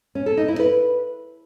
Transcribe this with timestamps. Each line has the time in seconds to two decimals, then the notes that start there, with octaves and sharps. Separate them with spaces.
0.15 C#4
0.26 A4
0.37 D#4
0.48 E4
0.59 B4